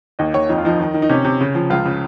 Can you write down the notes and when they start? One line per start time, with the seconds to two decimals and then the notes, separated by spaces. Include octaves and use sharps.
0.19 D#2 D#5
0.34 D#2 C#5
0.49 F2 D#4
0.58 F4
0.65 F3 D#4
0.80 D#3
0.94 D#3
1.02 D#4
1.09 C3 C#4
1.25 C3
1.41 C#3
1.55 F3
1.70 C#2 F4
1.85 C#3